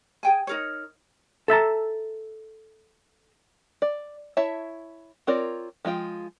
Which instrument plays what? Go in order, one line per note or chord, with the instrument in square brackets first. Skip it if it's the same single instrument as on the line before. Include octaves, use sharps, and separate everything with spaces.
[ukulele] G#4 G5 G#5
D#4 A#4 C#5
[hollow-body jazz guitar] A4 E5 A5 A#5
[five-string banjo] D5
E4 C#5 E5 A5
C4 F4 A#4 C#5 D5
F3 G#3 F4 G5